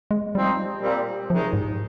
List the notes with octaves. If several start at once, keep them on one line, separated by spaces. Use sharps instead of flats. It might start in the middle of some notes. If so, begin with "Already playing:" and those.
G#3
F3 G3 C4 D#4
A#2 G3 C4
C3 D#3 F3 G#3 D#4
G#2